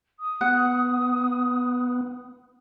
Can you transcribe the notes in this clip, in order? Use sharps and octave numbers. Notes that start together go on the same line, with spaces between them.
D#6
B3 F#5